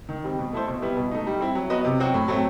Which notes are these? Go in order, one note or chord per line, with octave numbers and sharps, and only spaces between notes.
D#3
G3 C4
B2
A3 E4 A4 C5
B2
G3 B3 E4
B2
A3 D#4
G3
C4 E4
F#3
B3 F#4 B4 D#5
C3
F#3 C4 F#4
A2
F#3 A3 C4